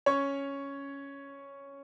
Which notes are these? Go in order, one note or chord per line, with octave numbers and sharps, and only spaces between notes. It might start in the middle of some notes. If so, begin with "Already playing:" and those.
C#4 C#5